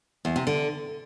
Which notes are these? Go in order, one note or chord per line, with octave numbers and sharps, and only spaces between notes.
E2
C3
D3